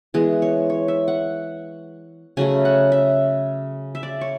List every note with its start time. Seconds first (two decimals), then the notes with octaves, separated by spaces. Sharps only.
0.14 E3 G#3 B3 G#4
0.42 C#5
0.70 C#5
0.88 E5
1.08 F#5
2.37 C#3 F#3 A3 G#5
2.65 F#5
2.92 E5
3.95 E5
4.03 D5
4.21 C#5